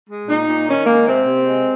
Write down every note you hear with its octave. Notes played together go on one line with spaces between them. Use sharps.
G#3
A#2 D#4
A#2
D#3 C#4
G#3 A#3
C3 C4
C3
G#3